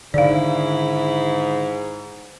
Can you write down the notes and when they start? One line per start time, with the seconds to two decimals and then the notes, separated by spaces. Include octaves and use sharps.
0.14 G#2 D3 D#3 E4 D5 F5